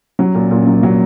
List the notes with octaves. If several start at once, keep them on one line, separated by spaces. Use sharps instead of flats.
F#3
A#2
A#2
F#3
F#3